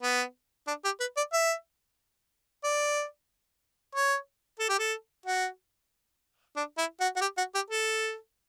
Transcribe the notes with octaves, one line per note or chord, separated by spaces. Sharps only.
B3
D4
G4
B4
D5
E5
D5
C#5
A4
G4
A4
F#4
D4
E4
F#4
F#4
G4
F#4
G4
A4